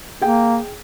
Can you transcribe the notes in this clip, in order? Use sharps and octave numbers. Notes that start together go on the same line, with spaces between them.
A#3 G#4 G5